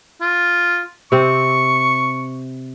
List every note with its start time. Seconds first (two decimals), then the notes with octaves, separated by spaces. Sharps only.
0.21 F4
1.12 C3 C4 C#6